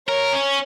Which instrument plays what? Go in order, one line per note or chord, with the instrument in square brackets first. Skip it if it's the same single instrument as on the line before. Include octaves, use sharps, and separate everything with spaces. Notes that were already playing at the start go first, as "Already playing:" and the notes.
[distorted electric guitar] A#4 [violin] C#5
[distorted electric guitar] C#4